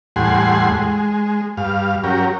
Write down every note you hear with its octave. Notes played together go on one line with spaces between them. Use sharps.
E2 A2 G3 F#5 G#5 C6
G#3
G2 F5
F#3 C#4 G4 A#4